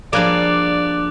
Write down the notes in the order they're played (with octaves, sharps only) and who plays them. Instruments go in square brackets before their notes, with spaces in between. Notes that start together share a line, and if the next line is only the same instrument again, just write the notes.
[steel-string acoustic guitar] F3 D4 [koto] G3 A#3 G#4 [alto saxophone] D5 [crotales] D6 F#6